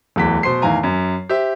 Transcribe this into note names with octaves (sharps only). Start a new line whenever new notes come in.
D1 E2 B6
B2 C5 C6 C7
E2 A2 D#3 F5 G#5 A#5
F#2
G4 C5 E5